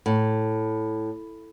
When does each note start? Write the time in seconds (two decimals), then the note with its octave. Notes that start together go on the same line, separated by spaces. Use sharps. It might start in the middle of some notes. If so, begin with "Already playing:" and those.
0.06 A2